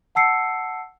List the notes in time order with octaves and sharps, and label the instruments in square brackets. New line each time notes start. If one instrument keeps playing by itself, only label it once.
[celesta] F#5 A5 E6 C7 C#7